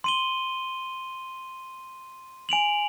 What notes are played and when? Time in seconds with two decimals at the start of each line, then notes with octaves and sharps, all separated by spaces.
0.04 C6 D#7 G7
2.49 G#5 D7 F7 F#7